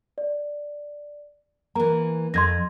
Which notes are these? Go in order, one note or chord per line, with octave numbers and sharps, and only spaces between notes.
D5
E3 A#3 A#5
F2 C6 G#6 A#6